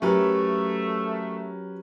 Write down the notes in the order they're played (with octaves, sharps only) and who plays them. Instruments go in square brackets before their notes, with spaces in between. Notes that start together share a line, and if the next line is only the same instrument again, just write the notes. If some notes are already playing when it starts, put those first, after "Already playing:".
[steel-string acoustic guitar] F#3 [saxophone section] A3 [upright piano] C#4 A#4 B4 [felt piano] G4